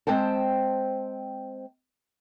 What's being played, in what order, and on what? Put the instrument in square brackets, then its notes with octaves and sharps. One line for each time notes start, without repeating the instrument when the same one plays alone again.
[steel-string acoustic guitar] G#3 C4 C5 G5 A5